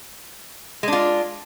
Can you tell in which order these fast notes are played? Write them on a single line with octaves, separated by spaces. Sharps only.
G#3 D4 F4